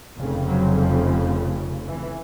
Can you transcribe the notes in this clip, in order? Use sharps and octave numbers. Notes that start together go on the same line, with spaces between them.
F1 F2 C#3
F#3
F3
E3